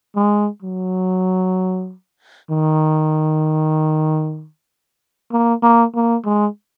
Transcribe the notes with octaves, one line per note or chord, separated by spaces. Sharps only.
G#3
F#3
D#3
A#3
A#3
A#3
G#3